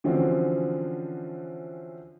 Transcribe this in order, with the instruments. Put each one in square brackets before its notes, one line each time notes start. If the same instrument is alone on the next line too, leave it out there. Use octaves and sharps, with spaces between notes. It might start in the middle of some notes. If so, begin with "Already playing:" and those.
[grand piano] D3 E3 F3 C4 C#4 F#4